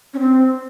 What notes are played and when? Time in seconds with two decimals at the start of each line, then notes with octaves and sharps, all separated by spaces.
0.14 C#4
0.19 C4